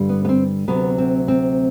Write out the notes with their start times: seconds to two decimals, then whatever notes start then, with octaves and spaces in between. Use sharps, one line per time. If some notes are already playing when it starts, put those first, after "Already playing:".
Already playing: G2 D3 G3
0.09 B3
0.25 B3
0.29 C4
0.68 D2 C3 F#3 B3
0.98 C4
1.28 C4